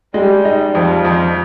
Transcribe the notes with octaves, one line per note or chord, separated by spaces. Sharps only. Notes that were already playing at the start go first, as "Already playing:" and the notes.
G3 G#3
D#4
F2 F3
F2